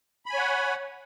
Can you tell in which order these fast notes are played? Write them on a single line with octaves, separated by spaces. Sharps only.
B5 G#5 C#5 F#5